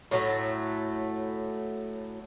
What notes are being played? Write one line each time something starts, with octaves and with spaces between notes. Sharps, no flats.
A2 F#3 A3